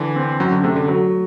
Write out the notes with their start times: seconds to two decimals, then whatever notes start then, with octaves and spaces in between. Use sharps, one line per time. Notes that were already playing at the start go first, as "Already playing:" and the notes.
Already playing: D3 E3
0.16 C4
0.40 F#2 F#3
0.52 D3
0.64 C3 A3
0.76 D3
0.88 F#3